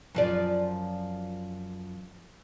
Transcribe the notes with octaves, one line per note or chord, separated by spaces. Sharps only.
F#2 F3 D5